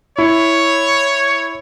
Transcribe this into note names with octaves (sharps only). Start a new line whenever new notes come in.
E4 C#5